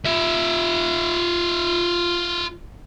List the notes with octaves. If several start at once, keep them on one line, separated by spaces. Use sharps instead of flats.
F4 E5